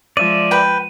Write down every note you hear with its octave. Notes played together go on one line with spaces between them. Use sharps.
F3 G#3 D5 E5 D#7
B4 G5